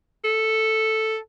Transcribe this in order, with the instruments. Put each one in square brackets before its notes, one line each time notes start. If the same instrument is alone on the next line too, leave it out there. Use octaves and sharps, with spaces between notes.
[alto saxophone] A4